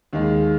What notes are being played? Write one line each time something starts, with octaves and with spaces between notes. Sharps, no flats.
D#2 D#3 G#3